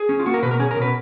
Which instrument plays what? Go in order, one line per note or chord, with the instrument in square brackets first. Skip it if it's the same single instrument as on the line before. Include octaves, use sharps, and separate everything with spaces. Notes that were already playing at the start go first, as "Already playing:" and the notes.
Already playing: [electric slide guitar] G#4
C#4
F4
A#3 F#4
A#4
B2 B4
A#4
C#4 G#4
A#4
B2
B4